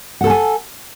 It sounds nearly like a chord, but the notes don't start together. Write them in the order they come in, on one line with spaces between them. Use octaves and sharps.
F#5 A4 A5 G#5